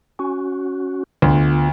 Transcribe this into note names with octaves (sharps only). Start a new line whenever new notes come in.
C#4 F#4
D2 B3 F4